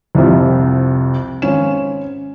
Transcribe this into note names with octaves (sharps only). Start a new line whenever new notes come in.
C2 F2 C3
G#1 C#4 E7